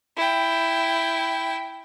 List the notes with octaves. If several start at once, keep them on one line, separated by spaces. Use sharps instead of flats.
E4 G5